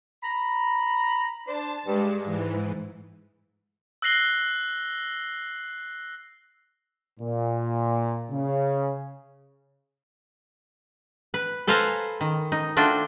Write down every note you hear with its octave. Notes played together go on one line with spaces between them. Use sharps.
A#5 B5
D4 C5 A5
G2 G#3
G#2 E3
E6 F#6 A#6 C7 F#7 G7
A#2
C#3
B4
A4 B4 C5 F5 G#5 A#5
D#3
D#4
A3 D4 F4 F#4 G5